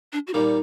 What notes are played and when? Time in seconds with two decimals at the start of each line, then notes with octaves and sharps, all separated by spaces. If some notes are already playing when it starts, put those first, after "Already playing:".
0.13 D4
0.27 F#4
0.34 A#2 G3 A#3 D#4